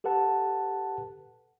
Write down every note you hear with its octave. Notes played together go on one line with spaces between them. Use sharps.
G4 A4 B4 F#5 A5